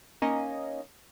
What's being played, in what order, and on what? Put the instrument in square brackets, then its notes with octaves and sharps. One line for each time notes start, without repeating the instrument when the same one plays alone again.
[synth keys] A#3 C#4 D#4 D#5